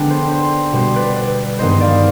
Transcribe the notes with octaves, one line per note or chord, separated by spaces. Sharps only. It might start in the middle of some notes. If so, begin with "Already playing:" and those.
Already playing: D3 G#3 B3 D4 G5
C5
C5
B2 G3 B3 C5
B4 D5
B4 D5
G2 D#3 G#3 B3 D#4 C5 D#5
D5 F5